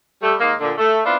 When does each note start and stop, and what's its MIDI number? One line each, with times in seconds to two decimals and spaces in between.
0.22 0.34 55
0.22 0.34 57
0.40 0.53 39
0.40 0.53 56
0.40 0.53 58
0.60 0.73 46
0.60 0.73 50
0.78 0.99 57
1.05 1.16 59
1.05 1.16 60
1.05 1.16 62
1.05 1.16 64
1.05 1.16 65